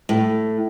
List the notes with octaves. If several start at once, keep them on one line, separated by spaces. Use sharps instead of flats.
A2